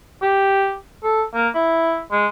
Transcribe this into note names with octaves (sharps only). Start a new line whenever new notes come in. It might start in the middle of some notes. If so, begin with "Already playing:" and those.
G4
A4
A#3
E4
G#3